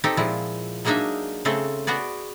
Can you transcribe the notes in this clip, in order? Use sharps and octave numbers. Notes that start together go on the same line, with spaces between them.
C4 D#4 G4 A4
A#2 F3 G#3 E4
F#3 G#3 A#3 D4 D#4 E5
C#3 A3 C4 G#4 A4
B3 F#4 G#4 D5